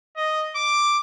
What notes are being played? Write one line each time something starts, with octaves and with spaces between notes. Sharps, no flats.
D#5
D6